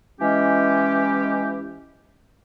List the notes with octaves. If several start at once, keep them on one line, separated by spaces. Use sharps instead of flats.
E3 G#3 C#4 G4